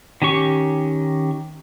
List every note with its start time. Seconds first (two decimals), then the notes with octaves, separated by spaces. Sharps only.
0.22 D#3 C#4 G4 C#6